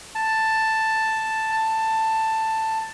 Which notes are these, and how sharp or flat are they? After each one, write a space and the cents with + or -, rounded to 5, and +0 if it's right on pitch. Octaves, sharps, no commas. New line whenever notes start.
A5 +5
A5 +10